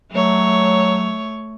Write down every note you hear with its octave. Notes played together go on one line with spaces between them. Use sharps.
F#3 A3 C#5